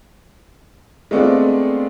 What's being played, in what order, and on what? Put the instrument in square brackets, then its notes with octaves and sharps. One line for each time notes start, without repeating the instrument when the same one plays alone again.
[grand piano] G#3 A3 B3 C4 D4 F4